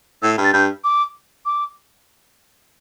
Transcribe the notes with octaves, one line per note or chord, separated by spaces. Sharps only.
A2 E6
G2
A6
G2 G6
D6
D6